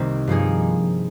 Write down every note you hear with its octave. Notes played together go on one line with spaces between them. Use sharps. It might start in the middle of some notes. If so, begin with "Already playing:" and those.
Already playing: C2 C3 D#3 G3 A#3 C4 D#4
G2 F3 A#3 D#4 G#4